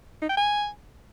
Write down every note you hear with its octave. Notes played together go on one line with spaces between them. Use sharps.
D#4
G5
G#5